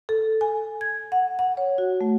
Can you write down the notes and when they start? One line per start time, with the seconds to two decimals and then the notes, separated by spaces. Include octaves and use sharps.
0.09 A4
0.41 G#5
0.81 G#6
1.12 F#5
1.39 F#5
1.57 C#5
1.78 F#4
2.01 A3